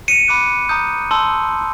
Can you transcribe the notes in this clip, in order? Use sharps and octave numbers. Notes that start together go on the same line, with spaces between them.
C#7 D#7
B5 D6 F#6
A#5 D#6 G6
A5 C6 E6